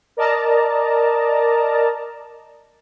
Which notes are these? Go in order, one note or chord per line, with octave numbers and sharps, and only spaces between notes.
A#4 D5 D#5 A5 A#5